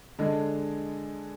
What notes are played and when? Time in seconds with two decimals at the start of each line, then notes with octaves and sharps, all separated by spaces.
0.19 D3 G#3 D4 G#4